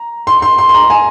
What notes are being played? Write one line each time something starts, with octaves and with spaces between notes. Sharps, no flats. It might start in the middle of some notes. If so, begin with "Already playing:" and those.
Already playing: A#5
C6
C6
C6
C6
A#5
G#5